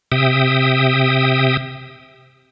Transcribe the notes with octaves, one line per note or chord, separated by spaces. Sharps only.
C3 E5 G5 D#6